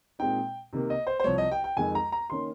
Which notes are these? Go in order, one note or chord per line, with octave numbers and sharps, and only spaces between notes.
A#2 G#3 C4 D#4 G5
C3 D#3 A#3
D#5
C5
C5
C2 C3 F3 C#5
D#5
G5
G5
F2 D#3 G#3 G#5
A#5
A#5
D#3 A#3 C#4 C6